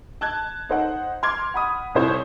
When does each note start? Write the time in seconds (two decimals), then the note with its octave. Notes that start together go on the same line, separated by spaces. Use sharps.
0.21 A5 F#6 G#6
0.69 D#4 C5 F#5
1.23 C6 D6 F6 G#6
1.54 F#5 B5 D#6
1.95 C2 E4 C5 C#5